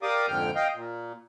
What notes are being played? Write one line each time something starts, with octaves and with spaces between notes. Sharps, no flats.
G4 A#4 D5 F5 D6 D#6
F2 G#2 D3 G5 F6
D#5 F5 G5
A#2